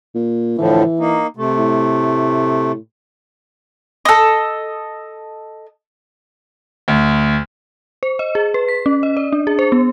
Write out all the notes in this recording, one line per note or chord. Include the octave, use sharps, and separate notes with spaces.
A#2
A2 D3 E3 F3
A#3 D#4
C3 A3
A2
A4 D#5
D2
C5
D#5
G#4
B4
B6
C#4
D#5
D5
D4
G#4
C5
B3